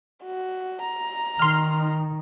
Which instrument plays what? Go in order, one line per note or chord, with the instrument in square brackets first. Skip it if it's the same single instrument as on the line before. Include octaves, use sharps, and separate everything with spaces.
[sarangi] F#4
A#5
[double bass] D#3 D#4 [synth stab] C6 F6